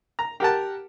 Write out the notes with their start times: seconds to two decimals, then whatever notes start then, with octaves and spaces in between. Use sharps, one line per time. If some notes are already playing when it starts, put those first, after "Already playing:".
0.19 A#5
0.40 G4 A#4 F#5 A5